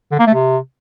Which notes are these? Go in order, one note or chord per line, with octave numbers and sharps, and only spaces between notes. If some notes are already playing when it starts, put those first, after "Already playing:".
D3
A#3
A3
C3